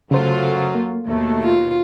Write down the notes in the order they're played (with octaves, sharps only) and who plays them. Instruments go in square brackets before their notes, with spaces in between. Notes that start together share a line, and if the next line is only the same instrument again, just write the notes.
[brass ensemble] F#2 F#3 [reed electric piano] C#3 C5 [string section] A3 F4
[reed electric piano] A#3
[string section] D#2 B2 [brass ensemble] A3
[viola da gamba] F4